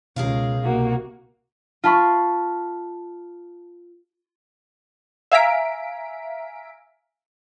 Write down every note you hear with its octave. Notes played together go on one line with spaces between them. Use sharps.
C#2 B2 G#4 A#4 F5
C2 A#3 F#4
F4 A5 B5 C#6
E5 F5 G#5 A#5 B6 D7